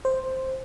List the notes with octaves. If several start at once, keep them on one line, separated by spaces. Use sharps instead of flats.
C5